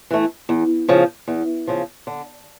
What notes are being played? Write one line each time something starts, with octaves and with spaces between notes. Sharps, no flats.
E3 A3
E2
C#3 F3
E2
C#3 F3
D3